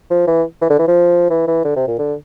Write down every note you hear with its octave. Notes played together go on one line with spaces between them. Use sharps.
F3
E3
E3
D3
E3
F3
E3
E3
D3
C3
A#2
D3